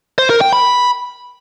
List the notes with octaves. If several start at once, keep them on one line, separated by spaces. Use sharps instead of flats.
C5
A#4
G5
B5